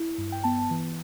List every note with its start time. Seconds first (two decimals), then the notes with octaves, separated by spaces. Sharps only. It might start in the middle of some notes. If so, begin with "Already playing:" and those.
Already playing: E4
0.18 G2
0.32 G5
0.44 B3 A5
0.71 E3